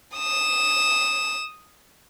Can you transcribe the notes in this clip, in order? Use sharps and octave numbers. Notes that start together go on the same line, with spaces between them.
D#6 E7